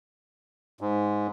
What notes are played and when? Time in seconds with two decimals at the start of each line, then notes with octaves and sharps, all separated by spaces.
0.81 G#2